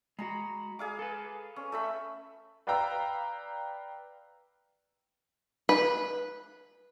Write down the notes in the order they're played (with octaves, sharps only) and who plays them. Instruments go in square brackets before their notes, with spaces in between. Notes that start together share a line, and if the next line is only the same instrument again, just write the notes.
[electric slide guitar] G#3 F#4 [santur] A#5 B5
[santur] G#4 F5 D6
[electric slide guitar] A4 B4
[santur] C#4
A3 E5 B5
[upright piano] B4 D5 F5 G5 A#5 E6
[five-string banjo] B4